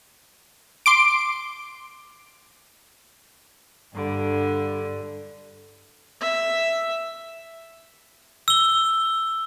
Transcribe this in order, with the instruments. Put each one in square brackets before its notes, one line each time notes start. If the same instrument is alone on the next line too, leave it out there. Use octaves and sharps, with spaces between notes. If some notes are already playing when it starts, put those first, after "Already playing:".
[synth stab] C6 D6 D7
[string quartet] G2 D3
[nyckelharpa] E5
[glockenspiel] E6 G7